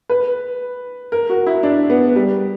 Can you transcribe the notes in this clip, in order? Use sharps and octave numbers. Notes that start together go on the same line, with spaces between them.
B4
A#4
F#4
E4
D4
B3
G3